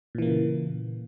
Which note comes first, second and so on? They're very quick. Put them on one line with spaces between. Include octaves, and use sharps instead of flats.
A#2 E3 A#3 C#3